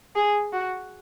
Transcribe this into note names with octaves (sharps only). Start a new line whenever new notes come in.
G#4
F#4